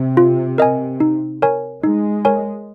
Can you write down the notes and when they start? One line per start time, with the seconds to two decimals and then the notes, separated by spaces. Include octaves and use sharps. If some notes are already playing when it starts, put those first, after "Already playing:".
Already playing: C3
0.17 F4
0.58 A#4 D#5 G#5
1.00 D#4
1.42 A#4 C#5 G#5
1.83 G#3 D#4
2.25 A#4 C#5 G#5